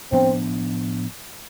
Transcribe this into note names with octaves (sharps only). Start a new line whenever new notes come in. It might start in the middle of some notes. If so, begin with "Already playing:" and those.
A2 F3 B3 C4 D4